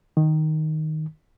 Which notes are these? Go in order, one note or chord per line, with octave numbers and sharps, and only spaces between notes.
D#3